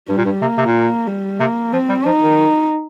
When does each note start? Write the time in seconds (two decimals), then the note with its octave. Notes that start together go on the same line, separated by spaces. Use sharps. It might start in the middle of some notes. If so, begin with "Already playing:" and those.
0.09 G2 G3
0.17 A#2
0.25 G2
0.42 C3 A#3
0.58 C3
0.66 A#2
1.07 G3
1.40 C3 A#3
1.73 F3 C4
1.89 G3
2.06 F3 D#4
2.22 D#3